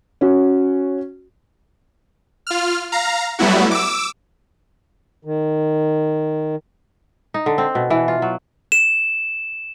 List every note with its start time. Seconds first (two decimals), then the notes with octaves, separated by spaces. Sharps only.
0.21 C#4 F#4
2.47 F4 F6
2.92 F5 A#5
3.39 F#3 G3 A3 B3 E4 F#4
3.71 D6 E6
5.25 D#3
7.34 D#4
7.46 D3
7.58 C4
7.75 B2
7.90 E3
8.08 F4
8.22 F#3
8.72 E7